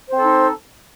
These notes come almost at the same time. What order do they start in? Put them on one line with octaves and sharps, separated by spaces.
C5 C4 A4 D#4